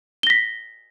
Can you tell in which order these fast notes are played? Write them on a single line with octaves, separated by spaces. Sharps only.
G7 A#6 B6